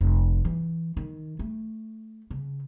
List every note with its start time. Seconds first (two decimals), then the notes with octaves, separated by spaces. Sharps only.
0.01 F1
0.45 E3
0.97 D#3
1.39 A3
2.30 C#3